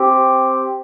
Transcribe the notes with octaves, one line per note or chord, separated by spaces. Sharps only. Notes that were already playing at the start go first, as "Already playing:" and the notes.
Already playing: C4 G4